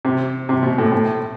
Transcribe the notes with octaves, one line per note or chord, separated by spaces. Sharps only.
C3
C3
B2
A2
A2